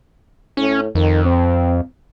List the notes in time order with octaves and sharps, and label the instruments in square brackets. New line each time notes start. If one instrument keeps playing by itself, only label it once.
[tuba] A2 [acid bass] C#4
[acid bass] F2 [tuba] D#3
[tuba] C4